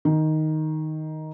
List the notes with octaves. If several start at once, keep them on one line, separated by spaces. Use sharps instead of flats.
D#3